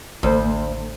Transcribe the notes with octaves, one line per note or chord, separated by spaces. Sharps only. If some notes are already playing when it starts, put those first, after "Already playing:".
A1 D2 A#3 C5